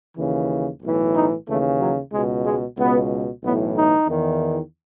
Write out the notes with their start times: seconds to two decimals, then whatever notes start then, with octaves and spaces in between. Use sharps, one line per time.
0.18 D#2 C#3 E3
0.82 B1 A2 E3
1.16 D#4
1.48 D#2 C#3 E3 A3
1.81 F#3
2.12 C#2 B2 G#3
2.46 G#3
2.78 C#2 B2 B3
3.44 B1 A2 E3 B3
3.76 D#4
4.08 E2 D#3